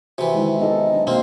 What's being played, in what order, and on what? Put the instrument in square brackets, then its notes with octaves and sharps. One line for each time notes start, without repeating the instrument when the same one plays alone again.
[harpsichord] C3 E3 [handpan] F#4
[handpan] D#3 G#3 [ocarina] E4
[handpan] B3 D#4 A4 [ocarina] D#5
[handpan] F#3 D4
[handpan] B2 F5 [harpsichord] A#3 C4